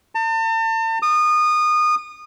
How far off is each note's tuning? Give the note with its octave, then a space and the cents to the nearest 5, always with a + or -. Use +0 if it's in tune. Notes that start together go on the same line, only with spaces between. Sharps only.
A5 +40
D#6 -25